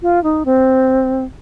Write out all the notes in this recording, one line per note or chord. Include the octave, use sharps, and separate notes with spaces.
F4
D#4
C4